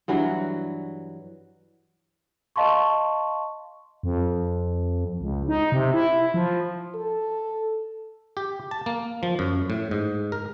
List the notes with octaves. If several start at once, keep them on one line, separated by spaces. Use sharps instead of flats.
G2 E3 F#3 F#4
D#5 F5 A5 C6 C#6
F2
C#2
D#4
C3
E4
F3
A4
G4
A5
A#3
F3
F#2
A2
G#2
A#4